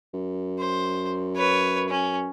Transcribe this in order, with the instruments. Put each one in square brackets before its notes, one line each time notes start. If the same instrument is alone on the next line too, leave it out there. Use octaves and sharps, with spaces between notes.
[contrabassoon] F#2
[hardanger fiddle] C5
B4 C#5
C#4